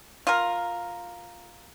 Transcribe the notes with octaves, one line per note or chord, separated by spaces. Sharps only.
F4 A#4